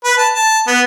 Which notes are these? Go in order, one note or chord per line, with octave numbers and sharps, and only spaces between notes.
B4
A5
A5
B3